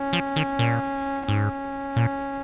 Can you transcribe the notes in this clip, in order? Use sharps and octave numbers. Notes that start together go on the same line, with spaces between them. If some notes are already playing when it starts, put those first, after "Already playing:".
Already playing: C#4
F3
D#3
A#2
G#2 C#4
A#2